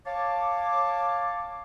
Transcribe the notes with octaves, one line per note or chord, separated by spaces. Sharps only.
C#5 F5 A5 D6